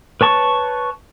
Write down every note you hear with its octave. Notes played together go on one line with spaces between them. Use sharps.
B4 C#5 A5 C#6